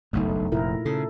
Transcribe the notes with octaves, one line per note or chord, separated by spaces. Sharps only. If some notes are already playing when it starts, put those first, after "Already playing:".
F#1 B1 G2 A3 D#4
F1 A#2 E4 A#4
C#3 A4